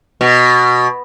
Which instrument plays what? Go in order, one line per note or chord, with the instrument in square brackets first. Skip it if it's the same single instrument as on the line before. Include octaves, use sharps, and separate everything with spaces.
[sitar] B2